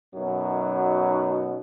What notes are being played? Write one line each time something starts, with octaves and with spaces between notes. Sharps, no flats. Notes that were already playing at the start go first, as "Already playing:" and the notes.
F#2 B2 F#3 D#4